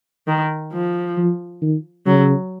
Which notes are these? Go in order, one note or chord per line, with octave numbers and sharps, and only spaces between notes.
D#3
F3
F3
D#3
C#3 F#3